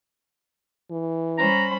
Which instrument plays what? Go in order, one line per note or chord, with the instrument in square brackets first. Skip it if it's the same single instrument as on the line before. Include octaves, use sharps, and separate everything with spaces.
[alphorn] E3
[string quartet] G3 C5 [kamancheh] C#4 B5 [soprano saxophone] A#5